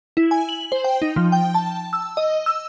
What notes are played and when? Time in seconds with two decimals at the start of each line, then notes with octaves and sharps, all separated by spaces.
0.17 E4
0.31 G#5
0.49 F#7
0.72 C5
0.84 G5
1.02 D#4
1.16 F3
1.32 G5
1.54 A5
1.93 E6
2.17 D#5
2.46 E6